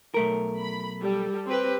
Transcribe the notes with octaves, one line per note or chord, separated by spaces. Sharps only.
B1 A3 A#4
B5
G3 A4
C4 G4 B4